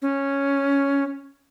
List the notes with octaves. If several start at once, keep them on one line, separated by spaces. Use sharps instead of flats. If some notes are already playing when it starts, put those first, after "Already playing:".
C#4